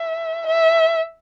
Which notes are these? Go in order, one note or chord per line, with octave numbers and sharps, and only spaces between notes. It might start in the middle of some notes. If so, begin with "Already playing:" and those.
Already playing: E5
E5